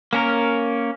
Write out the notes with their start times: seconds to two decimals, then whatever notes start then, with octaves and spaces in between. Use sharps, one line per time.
0.13 A#3 C#4 A#4